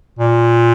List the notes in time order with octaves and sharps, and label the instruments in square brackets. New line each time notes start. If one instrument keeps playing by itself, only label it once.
[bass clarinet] A#2